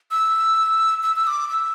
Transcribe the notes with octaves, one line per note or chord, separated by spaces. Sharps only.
E6
E6
E6
D6
E6